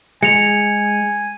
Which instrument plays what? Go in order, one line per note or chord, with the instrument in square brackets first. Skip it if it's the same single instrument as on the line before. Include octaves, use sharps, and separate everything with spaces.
[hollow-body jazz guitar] G#3 [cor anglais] G#5 [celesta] C#7 F7